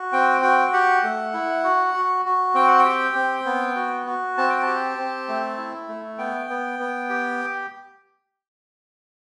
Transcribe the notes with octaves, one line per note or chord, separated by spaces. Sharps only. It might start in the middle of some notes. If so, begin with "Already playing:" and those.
Already playing: F#4
C4 G5
F#4 G5
G4 F#5
A3
E4
F#4
F#4
F#4
C4 G5
F#5
G5
G4
C4
B3
F#4
F#4
C4 A5
G5
G4 A5
C4
A3
E4
A3
B3 G5
B3
B3
G4